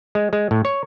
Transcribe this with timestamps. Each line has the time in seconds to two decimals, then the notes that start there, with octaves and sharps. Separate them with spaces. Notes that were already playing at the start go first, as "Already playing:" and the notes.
0.15 G#3
0.33 G#3
0.51 A2
0.65 C#5